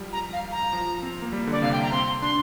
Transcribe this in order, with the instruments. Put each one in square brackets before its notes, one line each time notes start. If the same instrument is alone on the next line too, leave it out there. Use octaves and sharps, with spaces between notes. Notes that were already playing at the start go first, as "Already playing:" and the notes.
Already playing: [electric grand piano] F3 G3
[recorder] A#5
F5
A#5
[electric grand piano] F3
C4
A#3
G3
[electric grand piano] D3 [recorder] D5
[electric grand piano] C3 [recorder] F5
[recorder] G5
A#5
[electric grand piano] C4 [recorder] C6
[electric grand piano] D4 [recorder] C6